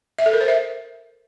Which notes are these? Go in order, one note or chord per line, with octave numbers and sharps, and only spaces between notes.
E5
A4
A#4
C5
E5